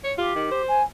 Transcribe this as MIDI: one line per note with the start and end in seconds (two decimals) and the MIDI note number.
0.04 0.13 73
0.18 0.32 65
0.18 0.62 67
0.35 0.47 51
0.51 0.80 72
0.68 0.82 80